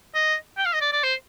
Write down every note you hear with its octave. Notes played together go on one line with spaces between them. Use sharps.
D#5
G5
F5
D#5
D5
D5
C5